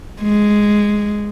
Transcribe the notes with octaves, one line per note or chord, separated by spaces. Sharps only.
G#3